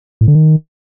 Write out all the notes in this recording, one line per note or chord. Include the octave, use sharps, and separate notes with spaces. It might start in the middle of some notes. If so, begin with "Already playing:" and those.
A2
D3
D#3